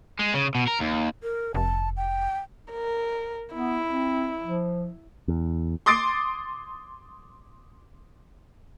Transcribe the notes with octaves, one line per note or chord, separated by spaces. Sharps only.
G#3
C#3
B2
A#4
D#2
A#4
F1 A5
G5
A#4
B3 E4
C4
F3
E2
C6 D6 D#6 A6 C7 D7